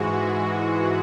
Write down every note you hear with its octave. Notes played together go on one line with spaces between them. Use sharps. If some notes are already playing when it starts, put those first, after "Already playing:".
Already playing: G#2 E3 G#3 F#4